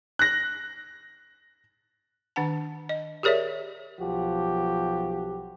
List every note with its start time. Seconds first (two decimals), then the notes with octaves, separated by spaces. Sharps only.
0.19 F#6 A#6
2.36 D#3 D4 F#5 A5
2.89 D#5
3.23 G4 G#4 A#4 C#5 D5 E5
4.00 B1 F3 F#4 G4